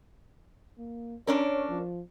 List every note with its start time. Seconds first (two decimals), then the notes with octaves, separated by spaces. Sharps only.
0.78 A#3
1.27 C#4 D4 A#4 C#5
1.70 F3